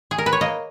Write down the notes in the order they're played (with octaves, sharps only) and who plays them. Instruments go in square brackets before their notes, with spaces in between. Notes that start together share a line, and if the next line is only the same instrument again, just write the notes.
[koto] G#4
A#4
B4
C#5
A#3 D#5